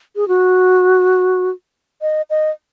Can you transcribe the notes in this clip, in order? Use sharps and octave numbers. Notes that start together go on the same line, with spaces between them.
G#4
F#4
D#5
D#5